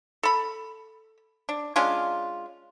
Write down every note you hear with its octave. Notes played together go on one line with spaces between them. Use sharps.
A4 B5
D4
G#3 C#4 D4 F4